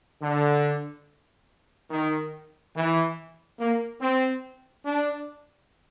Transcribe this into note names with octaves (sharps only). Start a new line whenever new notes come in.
D3
D#3
E3
A#3
C4
D4